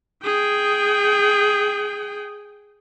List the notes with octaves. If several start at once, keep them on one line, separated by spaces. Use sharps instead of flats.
G#4 G5